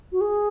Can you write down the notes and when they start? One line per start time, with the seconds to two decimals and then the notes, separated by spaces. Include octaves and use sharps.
0.12 F#4
0.21 G#4